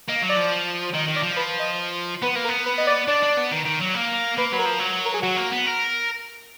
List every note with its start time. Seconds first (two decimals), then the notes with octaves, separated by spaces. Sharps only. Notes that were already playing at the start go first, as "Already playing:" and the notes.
0.09 A#3 D#5
0.22 F#3
0.29 D5
0.37 F3
0.94 D#3 D#5
1.08 D#3
1.16 D5
1.23 F3
1.36 B4
1.59 D#5
2.22 B3 B4
2.36 A#3
2.45 A#4
2.49 B3
2.66 B4
2.78 D#5
2.87 D5
3.08 D4 D5
3.23 D4
3.37 B3
3.51 D#3
3.65 D#3
3.80 F#3
3.94 A#3
4.37 A#3 B4
4.52 F#3 B4
4.59 A#4
4.65 F3
4.79 F#3
5.05 A#4
5.14 G#4
5.22 F#3 F#4
5.37 A#3
5.51 B3
5.66 A#4